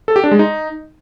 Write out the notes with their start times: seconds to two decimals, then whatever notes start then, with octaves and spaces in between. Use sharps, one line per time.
0.08 A4
0.16 G4
0.24 D4
0.31 G#3
0.39 D#4